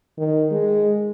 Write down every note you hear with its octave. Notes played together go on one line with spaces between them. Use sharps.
D#3
G#3